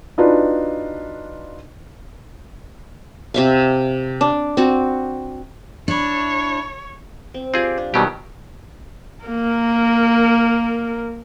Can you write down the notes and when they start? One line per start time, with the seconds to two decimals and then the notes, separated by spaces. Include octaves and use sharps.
0.18 D4 D#4 F4 F#4 B4
3.34 C3 E5 F5
4.21 D4
4.57 C4 F#4
5.88 D4 E4 C#5
7.34 C4
7.54 C4 F4 G4 G#4 D5
7.78 D4
7.94 B2 D#3 F#3 G3 G4
9.24 A#3 A#4